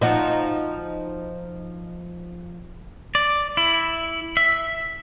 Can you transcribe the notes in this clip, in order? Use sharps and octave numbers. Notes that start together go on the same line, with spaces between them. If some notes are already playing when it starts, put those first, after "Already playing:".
F3 D#4 F#4
D5
E4
E5